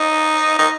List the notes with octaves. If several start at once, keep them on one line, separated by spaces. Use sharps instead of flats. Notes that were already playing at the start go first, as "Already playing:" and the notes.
Already playing: D#4
D#4